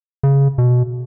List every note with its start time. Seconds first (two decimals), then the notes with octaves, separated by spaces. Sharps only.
0.23 C#3
0.58 B2